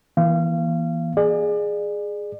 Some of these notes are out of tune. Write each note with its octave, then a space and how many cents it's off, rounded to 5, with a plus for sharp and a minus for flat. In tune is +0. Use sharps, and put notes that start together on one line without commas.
E3 +0 A#3 +35 F5 -30
G#4 +0 D5 +35